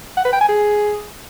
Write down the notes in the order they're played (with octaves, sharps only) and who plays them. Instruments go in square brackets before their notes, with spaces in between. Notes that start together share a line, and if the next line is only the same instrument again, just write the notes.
[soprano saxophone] F#5
B4
G5
G#5
G#4